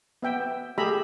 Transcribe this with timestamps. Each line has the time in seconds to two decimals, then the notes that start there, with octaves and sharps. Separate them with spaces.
0.22 B3 E5 G5
0.78 A3 G4 G#4 E5 A#5 B5